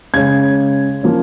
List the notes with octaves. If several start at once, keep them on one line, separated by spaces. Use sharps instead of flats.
C#3 G#3 C#4 G#6
F3 A#3 C#4